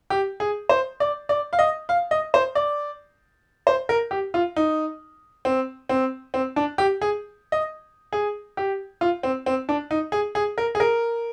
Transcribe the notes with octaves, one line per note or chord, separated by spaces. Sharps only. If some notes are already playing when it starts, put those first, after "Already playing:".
G4
G#4
C5
D5
D5
F5
D#5
F5
D#5
C5
D5
C5
A#4
G4
F4
D#4
C4
C4
C4
D4
G4
G#4
D#5
G#4
G4
F4
C4
C4
D4
D#4
G#4
G#4
A#4
G#4
A#4